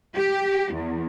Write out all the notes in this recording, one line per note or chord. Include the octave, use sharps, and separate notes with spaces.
G4
E2